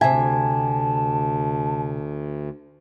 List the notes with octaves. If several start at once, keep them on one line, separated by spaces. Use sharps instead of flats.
D2 C3 E5 G#5 A5